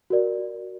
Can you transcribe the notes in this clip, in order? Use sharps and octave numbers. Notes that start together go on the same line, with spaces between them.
F#4 A#4 D5